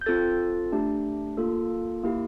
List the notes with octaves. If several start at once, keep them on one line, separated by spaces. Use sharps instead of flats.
G6
C4 F4 A4 A6
A3 D4 G4
A#3 F4 A4
A#3 E4 G4